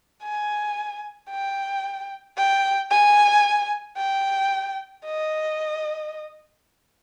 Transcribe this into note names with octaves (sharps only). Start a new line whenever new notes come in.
G#5
G5
G5
G#5
G5
D#5